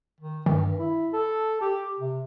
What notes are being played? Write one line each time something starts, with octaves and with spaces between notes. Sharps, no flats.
D#3
G2 D#3
E4
A4
G4
C3